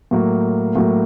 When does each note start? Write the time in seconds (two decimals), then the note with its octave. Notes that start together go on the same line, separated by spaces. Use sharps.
0.11 A2 F#3 A#3
0.76 A2 F#3 A#3